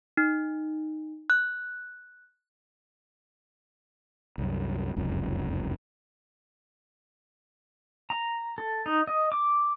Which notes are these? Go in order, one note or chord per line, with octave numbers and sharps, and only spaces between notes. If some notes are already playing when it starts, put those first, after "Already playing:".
D#4
F#6
C2 F#2
F1 C#2 F#2
A#5
A4
D#4
D#5
D6